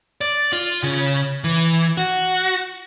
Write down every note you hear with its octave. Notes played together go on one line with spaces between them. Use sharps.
D5
F4
C#3
E3
F#4